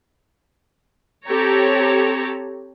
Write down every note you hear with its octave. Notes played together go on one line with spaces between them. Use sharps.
C4 G4 A4 C#5 A#5